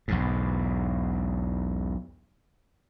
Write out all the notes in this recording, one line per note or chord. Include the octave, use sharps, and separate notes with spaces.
B1 E2 G#2